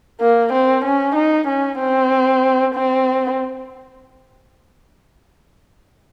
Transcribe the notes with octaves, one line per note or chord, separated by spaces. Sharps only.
A#3
C4
C#4
D#4
C#4
C4
C4